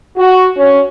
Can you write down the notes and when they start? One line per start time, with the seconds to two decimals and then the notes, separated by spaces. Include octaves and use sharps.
0.18 F#4
0.57 C#4